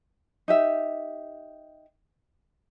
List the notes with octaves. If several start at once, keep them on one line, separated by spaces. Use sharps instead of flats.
D#4 G4 E5